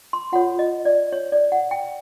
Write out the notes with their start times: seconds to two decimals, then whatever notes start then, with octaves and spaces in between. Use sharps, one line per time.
0.13 C6
0.32 F4 A4 C#5 F#5
0.59 D#5
0.85 D5
1.13 C#5
1.32 D5
1.52 F#5
1.71 G5